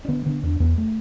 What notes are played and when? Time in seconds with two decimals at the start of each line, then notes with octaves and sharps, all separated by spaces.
0.05 D4
0.08 D3 B3
0.26 D3 B3
0.43 E2 D4
0.60 E2 B3
0.78 A3